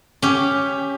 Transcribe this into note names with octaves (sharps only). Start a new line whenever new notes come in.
C#4 G4